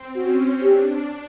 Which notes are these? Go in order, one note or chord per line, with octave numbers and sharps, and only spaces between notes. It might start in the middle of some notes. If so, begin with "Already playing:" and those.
Already playing: C4
C#4 F#4
D4 G4